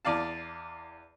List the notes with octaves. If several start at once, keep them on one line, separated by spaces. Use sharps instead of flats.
E2 D5 F5 A5